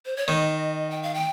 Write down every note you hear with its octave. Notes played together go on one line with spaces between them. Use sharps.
C5
C#5
D#3 D#5
G5
F5
G5